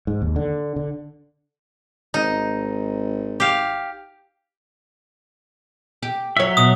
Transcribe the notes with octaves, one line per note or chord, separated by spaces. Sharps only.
G#2
D#2
D3
D3
G#1 D#4
G4 F5
G4
F#2 F#3 C#5 E5
B2 D#6